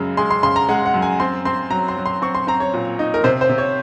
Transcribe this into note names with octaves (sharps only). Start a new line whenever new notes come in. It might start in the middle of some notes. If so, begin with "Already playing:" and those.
Already playing: F#2 C#3 G#3
G#3 C6
C6
C#3 C6
A#5
G#3 F#5
F#5
F#2
G#5
C4 C6
C4 C6
F#3 A#5
C6
F#3
C6
C4 C#6
C6
C4 A#5
C#5
A#2
D#4
A#4
C3 C5
C5
C3
C#5